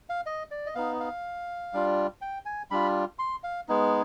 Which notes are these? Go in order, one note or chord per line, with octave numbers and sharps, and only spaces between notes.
F5
D#5
D5
D#5
B3 D#4 F5
F5
G3 D4 F4
G5
G#5
G3 D4 F4 B5
C6
F5
G#3 B3 D#4